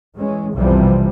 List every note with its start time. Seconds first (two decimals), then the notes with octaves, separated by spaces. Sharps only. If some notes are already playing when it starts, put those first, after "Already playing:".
0.16 E3 G#3 C#4
0.53 B1 F2 C3 E3 F3 G3